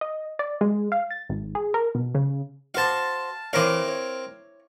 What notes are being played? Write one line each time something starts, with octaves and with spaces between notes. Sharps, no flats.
D#5
D5
G#3
F5
A6
G#1
G#4
A#4
B2
C#3
F#4 C5 F5 A5
E3 C4 A#4 C#5 F5
C#5